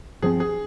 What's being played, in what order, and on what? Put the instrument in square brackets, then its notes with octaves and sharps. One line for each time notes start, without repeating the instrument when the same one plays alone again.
[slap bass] G2 F3 C4 [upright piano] G#4
[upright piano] G#4